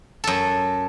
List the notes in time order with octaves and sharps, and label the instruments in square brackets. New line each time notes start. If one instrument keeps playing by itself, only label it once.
[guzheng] F#2 A4